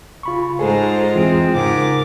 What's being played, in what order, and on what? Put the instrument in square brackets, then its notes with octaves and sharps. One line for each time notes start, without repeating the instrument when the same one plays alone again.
[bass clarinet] C#3 [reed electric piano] F4 B5 C#6
[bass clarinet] G#2 [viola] G#3 F4 [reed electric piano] G#4 A4 G#5 [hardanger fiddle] C5 A#5
[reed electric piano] E2 E3 [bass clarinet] C4
[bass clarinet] G#2 [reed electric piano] C#3 [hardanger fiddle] A#4 D6